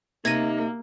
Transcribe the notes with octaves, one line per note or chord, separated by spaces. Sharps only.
C3 A#3 D#4 G#6 A#6 D#7